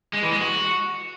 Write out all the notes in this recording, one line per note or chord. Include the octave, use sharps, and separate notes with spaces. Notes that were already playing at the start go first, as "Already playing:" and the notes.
G#3
E3
G#3
F#4